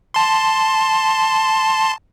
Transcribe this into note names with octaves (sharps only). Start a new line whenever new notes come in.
A5 C6